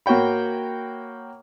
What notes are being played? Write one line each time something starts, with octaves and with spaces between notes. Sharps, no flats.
A#3 F#4 C#5 G5 B5